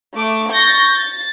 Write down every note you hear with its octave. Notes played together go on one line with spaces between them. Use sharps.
A3 D6
C#6 G6 A6 A#6
A6